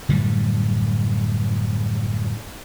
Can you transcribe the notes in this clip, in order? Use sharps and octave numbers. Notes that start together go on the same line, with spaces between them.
F#2 A2 D3 G3